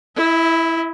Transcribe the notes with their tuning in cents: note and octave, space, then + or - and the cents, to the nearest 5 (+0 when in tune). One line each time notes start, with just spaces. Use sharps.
E4 +0 E5 -40